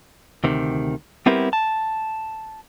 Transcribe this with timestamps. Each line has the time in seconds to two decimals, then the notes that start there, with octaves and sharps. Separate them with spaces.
0.44 D2 C3 D#3
1.26 G3 B3 C4 E4 G4 A#4
1.53 A5